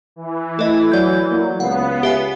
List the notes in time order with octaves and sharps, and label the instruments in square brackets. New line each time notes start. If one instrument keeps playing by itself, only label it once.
[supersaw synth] E3
[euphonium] A3 [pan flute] E4 [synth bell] A4 D#5
[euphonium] F#3 [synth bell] D5 G6
[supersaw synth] F#3 [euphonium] A#3
[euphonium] C#2 [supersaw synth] B3 [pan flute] F5 [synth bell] F#5
[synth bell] G4 E5 G#5